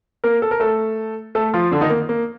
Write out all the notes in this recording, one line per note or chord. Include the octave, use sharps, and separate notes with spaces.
A#3 A#4
A4
A#4
A3 A4
A3 A4
F3 F4
D3 D4
D#3 D#4
A#3
A#3